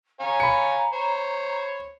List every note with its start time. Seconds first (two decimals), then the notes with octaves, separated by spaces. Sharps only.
0.20 C#5 F5 G#5 A#5
0.40 B5 C#7
0.93 C5 C#5